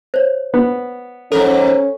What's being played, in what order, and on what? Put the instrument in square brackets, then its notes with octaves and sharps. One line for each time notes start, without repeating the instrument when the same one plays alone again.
[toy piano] C5 C#5
[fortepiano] B3
[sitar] F2 G#2 A#4 [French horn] C#4 [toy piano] A4